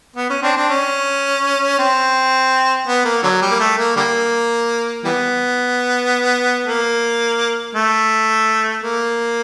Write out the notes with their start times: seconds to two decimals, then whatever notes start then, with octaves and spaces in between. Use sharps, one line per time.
0.16 B3
0.30 C#4
0.43 C4 D4
0.57 C4 D4
0.70 C#4
1.79 C4
2.87 B3
3.05 A#3
3.23 D3 F#3
3.42 G3
3.51 A#3
3.60 A3
3.78 A#3
3.96 D3 G3 A#3
5.04 E3 G3 B3
6.66 A#3
7.75 A3
8.84 A#3